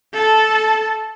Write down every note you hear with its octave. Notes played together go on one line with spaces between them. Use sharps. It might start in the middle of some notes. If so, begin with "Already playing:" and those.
A4 A5